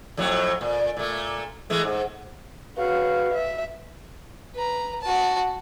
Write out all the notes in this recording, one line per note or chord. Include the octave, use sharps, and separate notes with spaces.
F2 A2 F#3
A#2
A#2 A3
E3 G#3 A3
G#2
C#3 F#4 B4 F5
E5
B4 A#5
F#4 A5